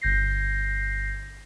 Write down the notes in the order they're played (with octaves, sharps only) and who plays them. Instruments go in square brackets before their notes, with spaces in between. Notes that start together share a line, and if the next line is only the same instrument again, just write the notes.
[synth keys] G1 G6 A#6 C7